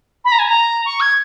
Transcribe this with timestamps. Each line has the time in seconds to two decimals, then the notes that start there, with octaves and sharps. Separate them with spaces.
0.24 B5
0.32 A#5
0.39 G#5
0.47 A#5
0.85 C#6
1.00 G#6